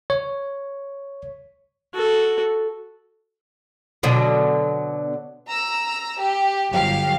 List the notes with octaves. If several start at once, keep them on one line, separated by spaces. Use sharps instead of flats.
C#5
F#4 A4
B2 D3 F#3
A#5 E6
G4
G1 F#3 G4 F5